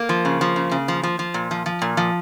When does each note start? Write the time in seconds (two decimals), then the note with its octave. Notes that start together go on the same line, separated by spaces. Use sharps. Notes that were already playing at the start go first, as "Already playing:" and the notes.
Already playing: A#3
0.09 F3
0.25 C#3
0.41 F3
0.56 C#3
0.71 C#3
0.88 F3
1.03 F3
1.19 F3
1.34 A#2
1.51 F3
1.66 F3
1.82 A#2
1.97 F3